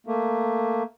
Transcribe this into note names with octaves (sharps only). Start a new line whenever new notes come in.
A3 A#3